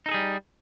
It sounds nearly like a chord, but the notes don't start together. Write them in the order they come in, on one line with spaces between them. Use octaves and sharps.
D#4 A4 G#4 G3